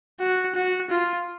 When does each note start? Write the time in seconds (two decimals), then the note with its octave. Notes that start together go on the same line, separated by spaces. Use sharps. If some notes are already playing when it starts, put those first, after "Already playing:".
0.20 F#4
0.55 F#4
0.90 F4